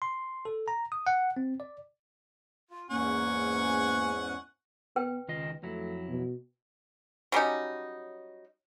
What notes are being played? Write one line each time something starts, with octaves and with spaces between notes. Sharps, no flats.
C6
A4
A#5
D#6
F#5
C4
D5
F4
E2 G#2 A#3 C#4 F#5 G#5 C#6
B3 B4 G5
C#2 D#3 F4 D#5
F2 F#3 A3 E4
B2
F#3 G3 C#4 D#4